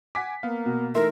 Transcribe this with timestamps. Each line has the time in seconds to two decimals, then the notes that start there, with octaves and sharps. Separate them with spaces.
0.15 F#5 G#5 D6 B6
0.43 A#3 B3 F5
0.66 B2
0.95 E3 A3 D#4 A#4 E5 C6